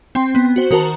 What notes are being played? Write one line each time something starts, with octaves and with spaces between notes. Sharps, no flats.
C4 G5 C6
B3
F#4 C5
D#3 F#4 A#4 C5 A5 A#5